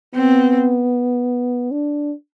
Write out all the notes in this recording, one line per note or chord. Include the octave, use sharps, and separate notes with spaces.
B3 C4
D4